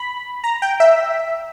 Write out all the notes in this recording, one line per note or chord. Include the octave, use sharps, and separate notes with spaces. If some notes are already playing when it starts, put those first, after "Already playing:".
Already playing: B5
A#5
G5
E5